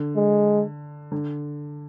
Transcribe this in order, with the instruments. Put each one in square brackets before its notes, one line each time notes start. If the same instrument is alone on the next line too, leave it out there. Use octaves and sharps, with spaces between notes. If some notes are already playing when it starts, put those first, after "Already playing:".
Already playing: [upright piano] D3
[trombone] G#3
[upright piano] D3